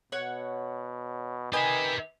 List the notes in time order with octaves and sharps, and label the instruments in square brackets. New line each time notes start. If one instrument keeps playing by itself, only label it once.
[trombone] B2 [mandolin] C#5 F#5 C#6
[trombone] D#3 [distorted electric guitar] G4 E5 [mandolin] B4 D#5 G#5